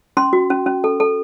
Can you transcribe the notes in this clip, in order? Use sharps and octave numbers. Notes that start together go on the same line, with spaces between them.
C#4 C6
F#4
C#4
C#4
A4
A4